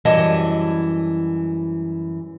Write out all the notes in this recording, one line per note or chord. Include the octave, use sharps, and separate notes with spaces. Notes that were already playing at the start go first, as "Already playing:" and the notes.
F#2 E3 G3 F#4 D#5 A5